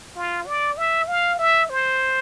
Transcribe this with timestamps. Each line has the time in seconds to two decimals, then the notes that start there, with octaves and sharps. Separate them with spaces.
0.16 F4
0.46 D5
0.78 E5
1.08 F5
1.39 E5
1.70 C5